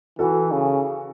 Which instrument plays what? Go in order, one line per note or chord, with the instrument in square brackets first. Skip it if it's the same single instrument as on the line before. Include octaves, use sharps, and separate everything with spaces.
[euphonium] E3 [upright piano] F#4 A4
[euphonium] C#3